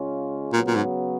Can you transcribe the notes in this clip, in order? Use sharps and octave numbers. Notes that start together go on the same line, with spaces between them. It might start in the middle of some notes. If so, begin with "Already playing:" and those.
Already playing: C#3 G#3 C#4 F4
A#2 C#3 F#3 B3
A#2
G#2